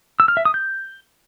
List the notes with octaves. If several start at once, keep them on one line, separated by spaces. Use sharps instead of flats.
E6
F6
E5
D#6
G6